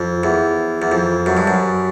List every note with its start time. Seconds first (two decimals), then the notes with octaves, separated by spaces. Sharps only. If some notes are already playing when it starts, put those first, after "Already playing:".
Already playing: F2
0.23 E2
0.82 E2
0.92 F2
1.26 F#2
1.37 G2
1.47 F#2